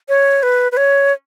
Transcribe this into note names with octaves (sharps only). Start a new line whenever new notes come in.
C#5
B4
B4
C#5